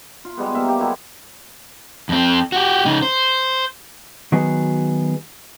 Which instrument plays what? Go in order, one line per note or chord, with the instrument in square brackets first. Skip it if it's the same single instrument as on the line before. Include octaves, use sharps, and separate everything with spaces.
[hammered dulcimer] F4
G3 G#3 B3
A#3 E5 F5
G4
F#3 G#3 E4
[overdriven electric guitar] F2 C4
F#4 G4
C#3 D#4
C5
[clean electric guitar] D#3 F#3 B3 F#4 G#4